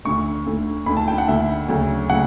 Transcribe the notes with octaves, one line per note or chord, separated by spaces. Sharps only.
D2 D3 A3 C#6
D2 D3 A3
D2 D3 A3 B5
A5
G5
F#5
D2 D3 A3 E5
D2 C#3 F#3 A3
C#3 F#3 A3 F#5